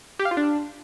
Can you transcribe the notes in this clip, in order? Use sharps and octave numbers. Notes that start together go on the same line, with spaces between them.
G4
F5
F4
D4